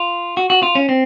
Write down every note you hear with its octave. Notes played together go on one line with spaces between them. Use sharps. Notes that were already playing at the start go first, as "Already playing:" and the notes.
Already playing: F4
F#4
F#4
F4
C#4
C4